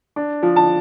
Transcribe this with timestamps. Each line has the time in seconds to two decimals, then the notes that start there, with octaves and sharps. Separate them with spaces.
0.16 D4
0.43 F3
0.56 A5